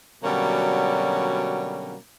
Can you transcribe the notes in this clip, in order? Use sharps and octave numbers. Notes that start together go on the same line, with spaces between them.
B2 D3 F#3 G3 A#3 C#4